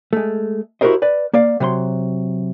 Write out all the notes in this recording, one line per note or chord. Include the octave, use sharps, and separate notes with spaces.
G#3 A3
E4 F#4 G4 A#4 C5 D#5
B4 D5
A#3 D5 F5
C3 F#3 A#5 C6